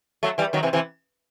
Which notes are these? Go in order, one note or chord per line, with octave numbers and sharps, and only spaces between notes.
F#3 A3
E3 G3
D#3 F#3
C3 E3
C3 E3